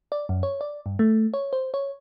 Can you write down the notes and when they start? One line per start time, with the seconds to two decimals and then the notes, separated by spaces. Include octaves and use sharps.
0.12 D5
0.29 F#2
0.43 C#5
0.61 D5
0.86 G2
0.99 A3
1.34 C#5
1.53 C5
1.74 C#5